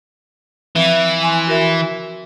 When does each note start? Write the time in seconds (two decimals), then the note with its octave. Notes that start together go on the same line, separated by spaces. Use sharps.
0.75 E3 F3 C4 E5
1.22 G#5 C6
1.47 F#4 A#4 E5